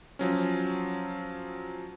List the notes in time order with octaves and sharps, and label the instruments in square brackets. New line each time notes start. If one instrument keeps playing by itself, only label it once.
[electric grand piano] F3 F#3 C#4